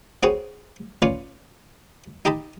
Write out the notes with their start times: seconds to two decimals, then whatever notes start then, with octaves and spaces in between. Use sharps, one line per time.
0.23 C4 F#4 G#4 B4 C#5
1.02 C#4 F4 B4 C#5 D5
2.25 D#4 G4 D#5 A5 B5